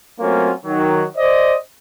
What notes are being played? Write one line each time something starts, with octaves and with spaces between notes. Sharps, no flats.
F#3 A3 A#3 C4 C#4 F4
D#3 F#3
C5 D5 D#5